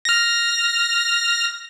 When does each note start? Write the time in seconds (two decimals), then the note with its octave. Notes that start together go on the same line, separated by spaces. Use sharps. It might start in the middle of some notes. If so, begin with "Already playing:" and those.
0.05 F6 A#6